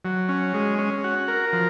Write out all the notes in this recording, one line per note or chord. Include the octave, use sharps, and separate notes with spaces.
F#3
C#4
G#3
C#4
F#4
A#4
F3